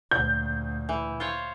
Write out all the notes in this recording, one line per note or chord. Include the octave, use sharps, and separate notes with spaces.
D2 A#2 G6
E3
F4 C5 C#5